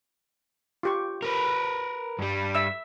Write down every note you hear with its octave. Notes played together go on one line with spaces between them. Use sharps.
F4 G4 C#6
A#4 B4
G2 G3
E5 E6